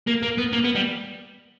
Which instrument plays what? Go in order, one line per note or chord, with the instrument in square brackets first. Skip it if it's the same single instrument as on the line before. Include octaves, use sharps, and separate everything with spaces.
[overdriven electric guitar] A#3
A#3
B3
A#3
B3
G3